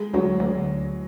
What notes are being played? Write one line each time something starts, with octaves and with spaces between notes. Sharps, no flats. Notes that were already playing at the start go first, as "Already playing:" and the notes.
Already playing: G#3
D2 F#3
D2